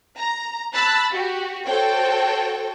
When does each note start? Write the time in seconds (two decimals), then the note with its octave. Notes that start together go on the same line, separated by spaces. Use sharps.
0.17 A#5
0.72 A5 B5 E6 F#6 A6
1.11 F#4 G4
1.65 F#4 A4 C5 C#5 G5